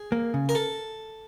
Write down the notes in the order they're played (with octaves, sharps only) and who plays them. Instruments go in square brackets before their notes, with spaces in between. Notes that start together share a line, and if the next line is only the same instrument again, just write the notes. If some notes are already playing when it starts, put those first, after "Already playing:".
Already playing: [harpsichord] G#4
[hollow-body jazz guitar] A#3
C#3
[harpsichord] A#4
A4